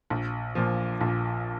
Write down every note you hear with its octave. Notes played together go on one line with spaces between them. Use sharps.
A#1
A#2 F3
A#1